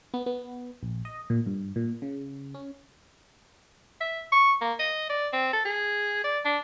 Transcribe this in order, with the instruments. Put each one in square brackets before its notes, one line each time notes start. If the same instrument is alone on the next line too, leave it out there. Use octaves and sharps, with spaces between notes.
[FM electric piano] B3
B3
A#1
D#5
A#2
G2
A#2
C#3
C#4
[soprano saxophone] E5
C#6
A#3
D#5
D5
C4
A4
G#4
D5
D4